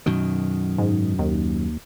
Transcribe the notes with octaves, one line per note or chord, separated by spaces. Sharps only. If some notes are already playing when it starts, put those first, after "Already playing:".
F#2 B2 D#3
G#2
D#2